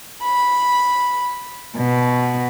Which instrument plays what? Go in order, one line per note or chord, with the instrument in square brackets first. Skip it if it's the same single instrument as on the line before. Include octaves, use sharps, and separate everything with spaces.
[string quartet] B5
B2